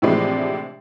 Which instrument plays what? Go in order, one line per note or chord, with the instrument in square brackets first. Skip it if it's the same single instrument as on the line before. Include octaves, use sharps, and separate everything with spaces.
[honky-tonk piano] A2 C3 E3 F3 G#3 D4